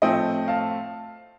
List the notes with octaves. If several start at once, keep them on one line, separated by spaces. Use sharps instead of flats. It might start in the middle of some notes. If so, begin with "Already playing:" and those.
A2 F3 A3 C4 D#5 G5
F5 A5